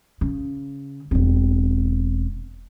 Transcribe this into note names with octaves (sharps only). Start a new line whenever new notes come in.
C#3
E1 C4